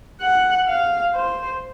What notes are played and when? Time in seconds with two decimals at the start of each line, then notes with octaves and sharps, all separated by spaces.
0.21 F#5
0.68 F5
1.15 C5